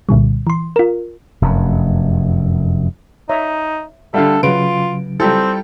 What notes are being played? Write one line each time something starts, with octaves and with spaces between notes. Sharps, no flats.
C2 A#2 D3 G3
E3 C6
F4 A#4
F1 F#2
D#4 C#5 E5 A#5
D3 G3 A4 E5 F5
C#3 F#3 F4 B4 D7
G3 C4 E4 F4 G4 A4 A#5